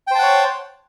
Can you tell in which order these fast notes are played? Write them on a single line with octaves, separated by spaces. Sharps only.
G5 C5 A5 F#5 C#5